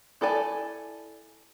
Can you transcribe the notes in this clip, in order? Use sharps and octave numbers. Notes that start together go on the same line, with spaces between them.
E4 A4 D5 G#5